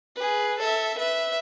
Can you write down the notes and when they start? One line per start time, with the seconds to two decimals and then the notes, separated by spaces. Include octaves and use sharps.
0.16 G#4 B4
0.59 A4 E5
0.98 B4 E5